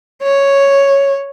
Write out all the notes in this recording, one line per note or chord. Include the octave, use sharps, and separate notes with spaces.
C#5